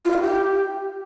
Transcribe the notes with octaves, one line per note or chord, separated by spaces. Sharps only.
F4
F5
E4
G4